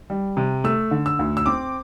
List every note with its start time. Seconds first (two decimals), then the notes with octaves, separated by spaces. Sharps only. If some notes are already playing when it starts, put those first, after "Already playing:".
0.10 G3
0.37 C3
0.64 A3 E6
0.91 D3
1.06 E6
1.19 D2
1.37 E6
1.46 C4 D6